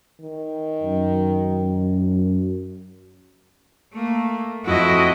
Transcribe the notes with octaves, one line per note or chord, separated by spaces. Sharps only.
D#3
F#2
A3 A#3
F2 E4 F#4 D#5